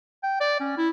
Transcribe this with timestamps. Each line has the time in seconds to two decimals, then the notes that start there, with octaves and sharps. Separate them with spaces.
0.23 G5
0.41 D5
0.60 C#4
0.78 E4